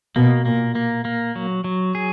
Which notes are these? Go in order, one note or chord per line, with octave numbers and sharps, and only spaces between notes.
B2 A#3
A#2 A#3
A#3
A#3
F#3
F#3
G#4